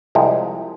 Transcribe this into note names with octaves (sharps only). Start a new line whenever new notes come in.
C2 C3 F3 G#3